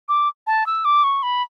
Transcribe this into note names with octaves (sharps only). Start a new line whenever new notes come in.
D6
A5
E6
D6
C#6
B5